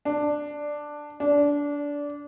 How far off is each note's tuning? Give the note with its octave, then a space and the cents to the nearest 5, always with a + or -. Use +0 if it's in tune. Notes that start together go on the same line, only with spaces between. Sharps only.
D4 +5
D4 -20